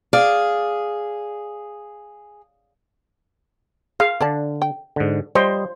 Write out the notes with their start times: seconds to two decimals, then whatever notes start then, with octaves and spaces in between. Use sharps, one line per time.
0.13 G#4 D5 F5
4.00 G#4 F5
4.21 D3 D4 D5 A5
4.62 G5
4.96 G#2 D3
5.35 F3 G3 C5 C#5 D#5